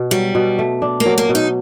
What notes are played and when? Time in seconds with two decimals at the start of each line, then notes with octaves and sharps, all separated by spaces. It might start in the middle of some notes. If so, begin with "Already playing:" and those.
Already playing: B2
0.11 F#3 G3
0.35 B2
0.59 A3
0.82 D4
1.00 A#3
1.06 F#3
1.18 A#3
1.29 B2
1.35 D#4